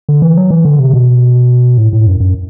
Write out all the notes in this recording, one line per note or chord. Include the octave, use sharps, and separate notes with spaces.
D3
E3
F#3
E3
D3
C3
B2
A2
A2
F#2
F#2